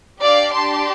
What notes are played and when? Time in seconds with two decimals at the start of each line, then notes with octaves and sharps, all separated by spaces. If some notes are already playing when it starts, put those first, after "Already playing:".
0.21 D4 G4 D5 F5
0.53 A5 C6